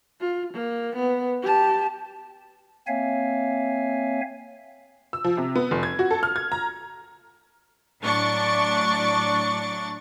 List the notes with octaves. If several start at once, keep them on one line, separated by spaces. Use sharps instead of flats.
F4
A#3
B3
G4 A5
A#3 C4 C#5 E5 F5 G#5
E6
F3
C3
B3
F1
G#6
F#4
A4
F6
G#6
A#5
A2 F#3 D4 D5 C#6 A6